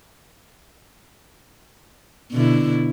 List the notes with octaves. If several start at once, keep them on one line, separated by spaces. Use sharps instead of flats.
B2 D3 E4